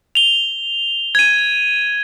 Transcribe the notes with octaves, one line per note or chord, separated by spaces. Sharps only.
F7 G7
G#6 D#7